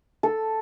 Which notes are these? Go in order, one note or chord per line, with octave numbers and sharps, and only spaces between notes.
A4